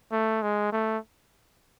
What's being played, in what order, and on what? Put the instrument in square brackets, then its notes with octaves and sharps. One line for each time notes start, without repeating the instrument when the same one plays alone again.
[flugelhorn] A3
G#3
A3